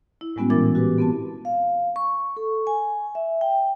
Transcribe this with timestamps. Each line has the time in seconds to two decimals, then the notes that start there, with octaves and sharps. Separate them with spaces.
0.21 E4
0.36 A2 G3 G#3 B3 C#4 F#4
0.50 A#2 E3 E4 A#4 D6 A6
0.75 F#4 G4 B4
0.98 B3 C4 A5
1.45 F5
1.96 C#6
2.37 A4
2.67 G#5
3.15 E5
3.41 G5